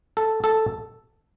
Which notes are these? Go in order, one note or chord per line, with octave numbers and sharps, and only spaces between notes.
A4
A4